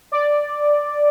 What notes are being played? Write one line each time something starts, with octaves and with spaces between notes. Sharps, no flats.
D5